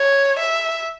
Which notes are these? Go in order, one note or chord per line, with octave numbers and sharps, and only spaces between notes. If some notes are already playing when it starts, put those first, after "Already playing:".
Already playing: C#5
E5